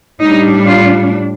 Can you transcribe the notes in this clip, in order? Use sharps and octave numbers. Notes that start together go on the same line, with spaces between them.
A2 G3 D4 D#4
F4